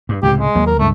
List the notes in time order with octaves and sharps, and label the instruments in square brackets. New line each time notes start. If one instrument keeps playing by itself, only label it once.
[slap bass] G2
[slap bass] C#2 A2 C3 [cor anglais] G4
[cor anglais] G#3
[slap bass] D#2 F#3 A#3
[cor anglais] A#4
[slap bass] C#2 G2 G#3 [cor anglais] A3